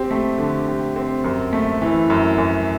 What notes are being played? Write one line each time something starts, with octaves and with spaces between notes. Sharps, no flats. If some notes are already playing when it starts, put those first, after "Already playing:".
Already playing: C4 G4
A3
D3
G4
C4
F#2
A3
E3
F#2
F#2